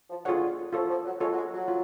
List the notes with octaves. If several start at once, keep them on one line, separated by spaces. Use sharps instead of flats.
F3
D3 F4 G#4 C#5 F#5
F3 F4 A4 C#5
F3
F#3
G#3 F4 A4 C#5
F#3
G#3
F#3
F4